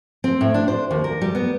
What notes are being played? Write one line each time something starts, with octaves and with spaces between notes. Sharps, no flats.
C4
A2
D4
C5
D#2
A#4
G3
B3